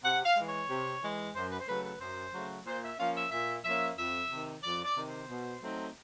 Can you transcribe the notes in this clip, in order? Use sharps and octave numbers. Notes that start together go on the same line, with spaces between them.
C3 F#5
F5
E3 G#3
C#5
C3
E3 G#3
F#2 C5
B4
C5
C#3 F#3 A3 B4
B4
F#2 C5
C#3 F#3 A3
A#2 C5
E5
F3 A#3 C#4 F5
E5
A#2 E5
F3 A#3 C#4 E5
F2 E5
C3 D#3
F2 D5
D5
C3 D#3
C5
B2
F#3 A3 C4 D#4